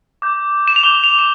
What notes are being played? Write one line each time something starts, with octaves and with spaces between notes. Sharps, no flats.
D6 G6
E7
F7
D6 G6 G7
F7
E7